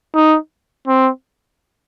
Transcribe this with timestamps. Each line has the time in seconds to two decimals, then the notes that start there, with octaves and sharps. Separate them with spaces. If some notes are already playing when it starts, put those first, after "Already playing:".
0.15 D#4
0.88 C4